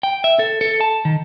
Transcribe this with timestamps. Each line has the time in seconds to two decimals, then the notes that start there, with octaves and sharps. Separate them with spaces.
0.03 G5
0.24 E5
0.39 A4
0.61 A4
0.81 A5
1.05 D#3